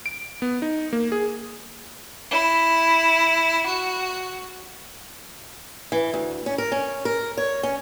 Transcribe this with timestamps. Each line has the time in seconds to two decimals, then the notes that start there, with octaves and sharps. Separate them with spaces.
0.06 D7
0.42 B3
0.62 D#4
0.93 A#3
1.12 G#4
2.30 E4
3.66 F#4
5.92 E3
6.14 D2
6.46 C#4
6.58 A#4
6.72 C#4
7.05 A#4
7.37 C#5
7.63 C#4